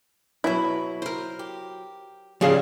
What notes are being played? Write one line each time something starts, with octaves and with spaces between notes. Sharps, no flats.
B2 F#3 E4 B4
A#4 C5
G4
C#3 F3 G3 G4 G#4 F5